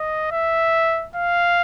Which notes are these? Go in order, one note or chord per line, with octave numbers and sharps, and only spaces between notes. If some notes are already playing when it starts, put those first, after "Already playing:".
Already playing: D#5
E5
F5